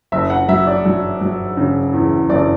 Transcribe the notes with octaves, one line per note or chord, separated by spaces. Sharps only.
F#1 E5
F#5
F#3 E5
D5
F#3
F#3
C#3
E2
F#1 D5